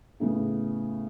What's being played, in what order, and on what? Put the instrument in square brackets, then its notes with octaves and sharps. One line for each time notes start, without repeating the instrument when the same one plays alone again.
[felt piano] A2 C#3 B3